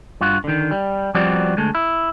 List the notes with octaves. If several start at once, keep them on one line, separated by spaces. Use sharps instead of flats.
G2 F4 F#4
D3 D#3
G3
F3 G3 B3 C4 F#4 D5
D2 G#3 A3
E4